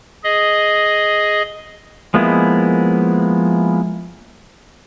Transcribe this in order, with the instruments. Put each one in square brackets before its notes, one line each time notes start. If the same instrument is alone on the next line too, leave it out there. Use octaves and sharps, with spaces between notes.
[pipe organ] G#4 D#5
[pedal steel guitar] F3 G#3 A#3 B3 E4